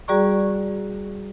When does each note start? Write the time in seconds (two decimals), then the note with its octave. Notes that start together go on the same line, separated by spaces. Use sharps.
0.08 G3 F#4 G#4 D5 A#5 C#6